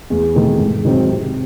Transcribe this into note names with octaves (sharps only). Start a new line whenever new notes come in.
E2
C3 D#3 A3
G#2
D#3 F#3 C4
C3